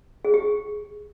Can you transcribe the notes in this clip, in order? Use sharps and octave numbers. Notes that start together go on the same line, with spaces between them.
G#4
G4